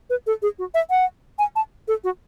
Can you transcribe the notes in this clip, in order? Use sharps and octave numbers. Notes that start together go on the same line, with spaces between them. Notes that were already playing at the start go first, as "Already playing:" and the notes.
B4
A4
G#4
F#4
E5
F#5
G#5
A5
A4
F#4